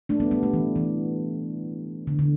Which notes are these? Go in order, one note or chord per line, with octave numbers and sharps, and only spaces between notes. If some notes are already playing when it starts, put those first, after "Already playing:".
A3 D4
G3 B3
G3 B3
A3
E3
E3
D3
D3